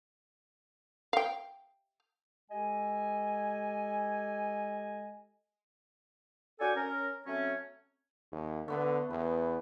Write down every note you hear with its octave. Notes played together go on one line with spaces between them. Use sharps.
F5 G5
G#3 G4 A4 D#5 G#5
D4 F#4 A4 D5 G5 G#5
C#4 A#4
F#3 A3 C4 C#4
D#2
D3 A3 B3 B4
E2 B3